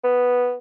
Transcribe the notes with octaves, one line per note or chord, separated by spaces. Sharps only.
B3